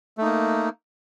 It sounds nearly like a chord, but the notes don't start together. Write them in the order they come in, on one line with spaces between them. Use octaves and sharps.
A3 D#4 A#3